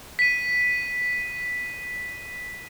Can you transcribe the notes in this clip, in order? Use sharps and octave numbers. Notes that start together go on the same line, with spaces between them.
B6 D#7